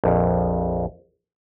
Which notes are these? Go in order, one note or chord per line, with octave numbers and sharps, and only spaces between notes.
A#1 F2